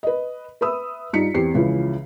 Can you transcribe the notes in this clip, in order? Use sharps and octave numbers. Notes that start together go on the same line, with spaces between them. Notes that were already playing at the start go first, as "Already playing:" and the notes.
B4 D#5
B4 E5 B5 D#6 E6
G2 D#4 F4 B6 C#7
E2 C4 G4 C7
C#2 C#3 E3 F3